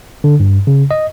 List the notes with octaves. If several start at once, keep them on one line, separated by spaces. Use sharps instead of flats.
D3
G2
C#3
D#5